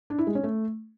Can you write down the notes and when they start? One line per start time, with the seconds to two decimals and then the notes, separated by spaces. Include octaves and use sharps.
0.10 D4
0.18 E4
0.27 G#3
0.35 C#4
0.44 A3